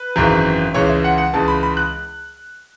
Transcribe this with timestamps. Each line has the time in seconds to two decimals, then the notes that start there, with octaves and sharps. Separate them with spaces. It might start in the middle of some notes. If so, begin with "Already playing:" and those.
Already playing: B4
0.16 G#1 F#2 C#3 E3
0.74 C#2 C#3 E3 C#5
0.89 E5
1.04 F#5
1.18 F#5
1.33 C#2 C#3 E3 A5
1.48 B5
1.63 B5
1.77 F#6